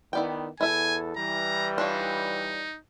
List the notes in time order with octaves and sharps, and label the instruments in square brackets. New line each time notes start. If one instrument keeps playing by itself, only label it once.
[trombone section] D#3 B3 [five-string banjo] E4 D5 G5
[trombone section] E2 A4 [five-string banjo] E4 E5 [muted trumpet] G#5
[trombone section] E3 G3 [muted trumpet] A#5
[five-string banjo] D4 F4 C#5 [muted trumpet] D#4